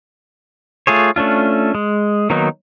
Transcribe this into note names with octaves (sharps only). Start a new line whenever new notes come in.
A3 F4 G#4 C#5
A3 C#4 D4 F4
G#3
D#3 F#3 A#3 B3 D#4